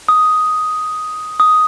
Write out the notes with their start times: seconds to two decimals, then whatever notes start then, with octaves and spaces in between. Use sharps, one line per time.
0.08 D#6
1.40 D#6